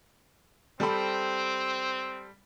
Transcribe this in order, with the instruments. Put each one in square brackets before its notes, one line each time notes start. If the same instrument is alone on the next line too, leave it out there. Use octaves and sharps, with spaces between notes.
[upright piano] G3 A4 B5 [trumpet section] C4